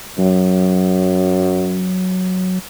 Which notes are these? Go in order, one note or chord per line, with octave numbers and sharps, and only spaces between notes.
F#2 F#3